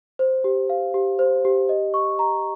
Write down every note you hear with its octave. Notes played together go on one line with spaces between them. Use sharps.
C5
G4
F5
G4
C5
G4
D#5
C#6
A#5